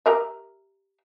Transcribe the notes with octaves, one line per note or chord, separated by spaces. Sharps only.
G4 A#4 E5